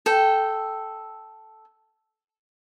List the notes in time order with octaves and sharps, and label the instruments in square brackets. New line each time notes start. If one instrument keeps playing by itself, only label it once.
[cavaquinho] A4 G5